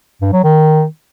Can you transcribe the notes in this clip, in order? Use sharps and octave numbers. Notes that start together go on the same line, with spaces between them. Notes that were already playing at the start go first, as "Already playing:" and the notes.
G2
F#3
D#3